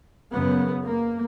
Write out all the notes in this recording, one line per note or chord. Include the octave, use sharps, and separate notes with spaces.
F#2 C#3 B3
A#3